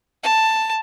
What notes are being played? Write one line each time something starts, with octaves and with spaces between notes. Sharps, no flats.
A5